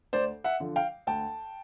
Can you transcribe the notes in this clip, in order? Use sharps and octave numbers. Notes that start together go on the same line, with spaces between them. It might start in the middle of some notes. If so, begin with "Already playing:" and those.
D2 C5 D5
E5 F#5
D3 F3
F5 G5
D2 G5 A5